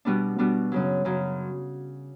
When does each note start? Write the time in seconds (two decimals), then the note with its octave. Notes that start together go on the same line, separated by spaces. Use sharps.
0.05 B2 G3 B3 D4
0.38 B2 G3 B3 D4
0.72 F#2 C#3 F#3
1.05 F#2 C#3 F#3